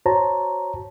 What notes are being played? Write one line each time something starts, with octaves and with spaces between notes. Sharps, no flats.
F#4 C5 C#5 A5 A#5